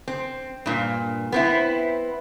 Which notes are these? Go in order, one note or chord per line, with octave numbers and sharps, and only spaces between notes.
C4
G2 A#2
B3 C4 E4